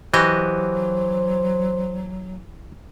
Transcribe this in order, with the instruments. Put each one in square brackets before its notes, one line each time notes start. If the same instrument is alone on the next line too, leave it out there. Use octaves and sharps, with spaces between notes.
[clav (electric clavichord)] E3 [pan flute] F#3 [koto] F#4 G4 D#5 [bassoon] C5